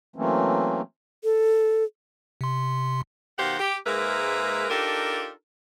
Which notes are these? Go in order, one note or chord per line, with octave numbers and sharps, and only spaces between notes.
E3 F#3 A3 A#3 C4 C#4
A4
C3 C6
B2 D#3 G4 C5 F5 F#5
G4
G#2 G#3 A#3 A#4 B4 E5
D4 D#4 F4 G4 A4 A#4